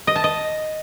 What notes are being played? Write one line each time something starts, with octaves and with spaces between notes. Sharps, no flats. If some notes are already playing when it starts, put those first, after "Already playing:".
D#5
A5
D#5